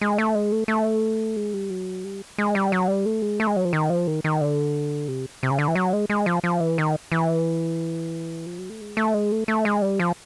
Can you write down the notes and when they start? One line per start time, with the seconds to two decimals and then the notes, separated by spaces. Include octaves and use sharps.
0.01 G#3
0.18 A3
0.35 G#3
0.52 A3
0.68 A3
1.37 G#3
1.54 G3
1.70 F#3
2.04 G3
2.38 G#3
2.55 G3
2.72 F#3
2.88 G3
3.05 A3
3.22 G#3
3.40 A3
3.47 G#3
3.56 F#3
3.65 F3
3.73 D#3
3.90 F3
4.07 D#3
4.24 D#3
4.41 D3
5.08 C3
5.43 C3
5.51 C#3
5.59 D3
5.68 E3
5.75 F#3
5.93 G#3
6.10 G#3
6.26 F3
6.44 F3
6.60 E3
6.78 D#3
7.12 E3
8.46 F3
8.58 F#3
8.70 A3
8.81 G#3
8.97 A3
9.14 G#3
9.32 A3
9.48 A3
9.65 G#3
9.82 G3
10.00 F3